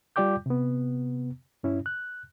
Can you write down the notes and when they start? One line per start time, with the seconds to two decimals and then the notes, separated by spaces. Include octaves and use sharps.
0.16 G3 F4 D5 G5 D6 G6
0.46 C3 B3
1.63 G2 C#4 E4
1.86 F#6